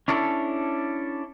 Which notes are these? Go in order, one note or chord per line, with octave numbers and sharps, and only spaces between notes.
C#4 D4 E4 A4